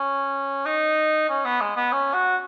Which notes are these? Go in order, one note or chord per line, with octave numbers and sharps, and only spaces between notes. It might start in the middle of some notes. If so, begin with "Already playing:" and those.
Already playing: C#4
D#4
C#4
B3
G#3
B3
C#4
F#4